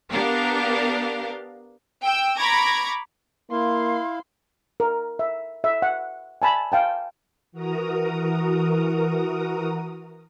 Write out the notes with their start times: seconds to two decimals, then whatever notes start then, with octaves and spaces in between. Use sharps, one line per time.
0.12 B3 D4 G4 A#4 F5
2.04 G5 E6
2.38 A#5 B5 C#6 D6 G#6 A#6
3.51 A#3 E4 F5 C6
4.80 A#4
5.19 E5
5.64 E5
5.82 F#5
6.42 G#5 A5 B5
6.72 F5 G5 A5
7.52 E3 F#4 A#4 A#5 D#6